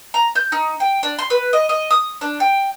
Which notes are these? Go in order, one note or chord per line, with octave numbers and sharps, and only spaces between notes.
A#5
G6
D#4
G5
D4
C6
B4
D#5
D#5
D#6
D4
G5